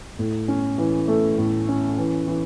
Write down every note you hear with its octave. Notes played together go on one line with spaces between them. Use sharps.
A2
C#4
E3
A3
A2
C#4
E3
E3